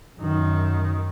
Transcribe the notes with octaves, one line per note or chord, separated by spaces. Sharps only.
F#2 D#3